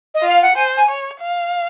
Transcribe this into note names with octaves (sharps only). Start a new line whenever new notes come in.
D#5
F4
F5
F#5
C5 G#5
G#5
C#5
F5